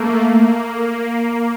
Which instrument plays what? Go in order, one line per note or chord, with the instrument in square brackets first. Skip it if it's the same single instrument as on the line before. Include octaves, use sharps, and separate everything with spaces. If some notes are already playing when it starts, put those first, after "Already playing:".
Already playing: [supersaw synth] A3 A#3
A#3